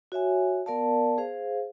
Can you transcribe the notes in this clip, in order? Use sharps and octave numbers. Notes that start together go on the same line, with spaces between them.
F#4 C#5 E5 G#5
B3 A#4 D5 F5 A5
G#4 C5 F5